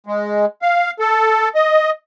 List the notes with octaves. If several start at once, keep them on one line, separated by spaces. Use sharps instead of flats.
G#3
F5
A4
D#5